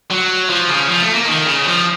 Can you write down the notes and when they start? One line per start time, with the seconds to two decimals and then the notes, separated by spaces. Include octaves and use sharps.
0.10 F#3
0.49 F3
0.69 C#3
0.88 F3
1.01 A3
1.14 A#3
1.27 D#3
1.47 C#3
1.66 F3